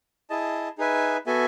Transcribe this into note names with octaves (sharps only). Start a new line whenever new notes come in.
E4 G#4 D#5 A5
D#4 G#4 B4 E5 G#5
B3 F#4 A4 E5 G#5